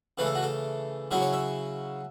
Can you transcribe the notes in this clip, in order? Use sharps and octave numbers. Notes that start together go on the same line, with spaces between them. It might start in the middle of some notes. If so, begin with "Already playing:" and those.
C#3 E3 A3 B4
A4
F#4
A4
C#3 F#3 C#4 E4 E5
C#5
E5